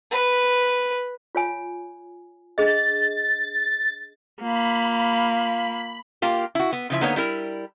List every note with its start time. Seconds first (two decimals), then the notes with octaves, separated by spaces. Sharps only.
0.11 B4
1.35 F4 C#5 G#5
2.58 D4 G#4 D#5 A6
4.43 A#3 F4 B5
6.22 A#3 F4 G4
6.55 E4 F#4
6.73 B3
6.90 C#3 F3 E4
7.01 D3 A#3 B3 D#4 C5 C#5
7.16 G3 E4 A#4